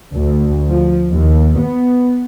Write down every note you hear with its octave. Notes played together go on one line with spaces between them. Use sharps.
D2
F3
D#2
B3